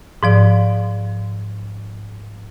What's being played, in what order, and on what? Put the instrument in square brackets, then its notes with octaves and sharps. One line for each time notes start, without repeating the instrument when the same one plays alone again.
[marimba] G#2 F3 D5